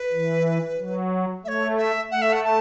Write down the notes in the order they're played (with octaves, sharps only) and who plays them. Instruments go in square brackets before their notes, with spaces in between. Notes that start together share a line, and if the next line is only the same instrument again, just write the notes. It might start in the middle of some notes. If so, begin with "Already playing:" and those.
Already playing: [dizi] B4
[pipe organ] E3
F#3
[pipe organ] A3 [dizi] C#5 E5
[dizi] E5
[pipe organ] A3 [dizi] F#5
[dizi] E5
F#5
A5